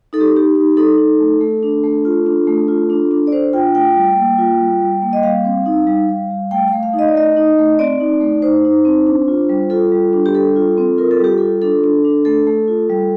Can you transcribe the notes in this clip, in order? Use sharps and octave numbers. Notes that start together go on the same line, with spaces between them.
D#4 A4
G4
D#4 G4
D#4
D#4 A4
D#4
A3
A3
D4
A3
F4
D4
A3
F4
D4
D4
D5
D4 C5
F4 G5
A3 G5
G3
A#3
F4
G3
G3
A#3
D#5
G3 F5
C4
D#4
G3
G3
G3
A3 G5
A3 F5
F5
D#4
D#5
D5
A3 D#5
D#4
A3
C4 D5
D#4
A3
D#4 C5
D#4
C4
D4
F4
G3
F4 A4
G3
D4
G4
G3 A4
F4
C4
F4 A#4
A4
G3 G4
F4 A4
D4 A4
D4
D4
A3 A4
A3
F4
G3